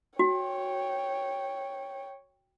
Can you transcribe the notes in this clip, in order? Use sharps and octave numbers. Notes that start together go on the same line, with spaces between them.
F#4 C#5 G5